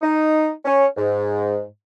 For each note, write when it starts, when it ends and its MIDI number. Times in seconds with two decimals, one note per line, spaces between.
0.02 0.51 63
0.65 0.85 61
0.97 1.62 44